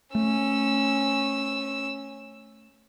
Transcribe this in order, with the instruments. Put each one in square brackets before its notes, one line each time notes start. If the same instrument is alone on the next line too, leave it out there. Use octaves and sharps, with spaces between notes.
[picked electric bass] A3 [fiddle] C#4 E6